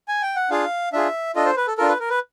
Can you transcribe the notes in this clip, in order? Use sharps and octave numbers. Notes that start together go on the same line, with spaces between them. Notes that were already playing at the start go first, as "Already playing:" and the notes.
G#5
G5
F#5
D4 F4 G#4 F5
D4 F4 G#4 E5
D4 F4 A4 D#5
C5
B4
A4
D4 F4 A4 A#4
B4
A#4
B4